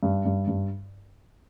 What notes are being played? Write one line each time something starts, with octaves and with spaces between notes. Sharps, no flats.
G2
G2
G2